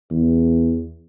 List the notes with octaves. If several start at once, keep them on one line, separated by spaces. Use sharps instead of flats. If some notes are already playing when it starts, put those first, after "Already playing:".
E2